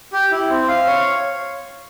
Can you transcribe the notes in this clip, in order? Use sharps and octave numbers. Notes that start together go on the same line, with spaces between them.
G4
E4
C4
F5
C#5